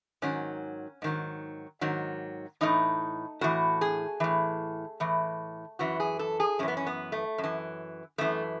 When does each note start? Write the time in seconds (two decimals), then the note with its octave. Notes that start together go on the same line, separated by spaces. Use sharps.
0.22 G#2 D#3 F#3 C#4
1.02 G#2 D#3 F#3
1.81 G#2 D#3 F#3
2.61 A2 E3 D#4
3.41 A2 E3 F#4
3.81 G#4
4.20 A2 E3
5.00 A2 E3
5.79 F#2 E3 F#4
6.00 G#4
6.19 A4
6.40 G#4
6.59 F#2 C#4
6.63 E3
6.68 B3
6.77 C#4
6.87 B3
7.12 A3
7.38 F#2
7.44 E3
8.18 F#2 E3 A3